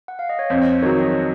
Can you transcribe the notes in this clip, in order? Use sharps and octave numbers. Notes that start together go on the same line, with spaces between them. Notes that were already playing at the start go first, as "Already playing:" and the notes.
F#5
F5
D#5
C#5
F2 C5
D#3 F#3 C#5
D#5